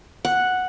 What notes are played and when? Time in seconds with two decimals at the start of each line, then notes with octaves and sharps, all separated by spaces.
0.25 F#5